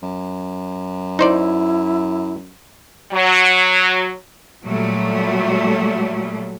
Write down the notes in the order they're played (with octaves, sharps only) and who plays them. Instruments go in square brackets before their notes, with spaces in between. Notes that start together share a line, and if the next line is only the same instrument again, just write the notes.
[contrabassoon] F#2
[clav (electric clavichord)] D#4 C5 D5 [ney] E4
[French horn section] F#3
[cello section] A#2 F#3 G3 A3